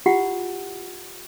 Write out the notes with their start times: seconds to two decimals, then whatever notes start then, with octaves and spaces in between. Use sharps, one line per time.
0.06 E4 F4 G4 F#5